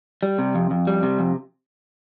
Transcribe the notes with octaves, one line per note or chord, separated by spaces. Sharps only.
G3
C3
F2
F2
G3
C3
F2